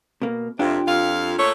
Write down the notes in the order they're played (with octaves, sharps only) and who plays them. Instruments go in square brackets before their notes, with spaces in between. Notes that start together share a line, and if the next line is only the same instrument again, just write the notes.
[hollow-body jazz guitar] B2 A#3
[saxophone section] F2 C3 [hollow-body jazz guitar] D4 F4 G4
[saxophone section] F2 F5
A#2 A3 C#5